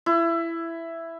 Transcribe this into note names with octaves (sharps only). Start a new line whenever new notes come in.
E4